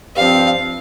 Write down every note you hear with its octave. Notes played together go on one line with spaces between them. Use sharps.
G2 F3 C4 F5